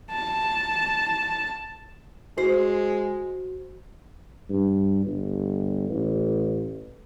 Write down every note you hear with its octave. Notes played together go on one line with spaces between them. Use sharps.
A5
G#3 F#4 C5
G2
G1
A1